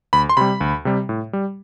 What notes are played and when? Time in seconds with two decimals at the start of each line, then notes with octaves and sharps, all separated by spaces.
0.13 D2 B5
0.29 C6
0.37 C3 G3 B5
0.61 D2
0.85 C3 G3
1.09 A2
1.33 G3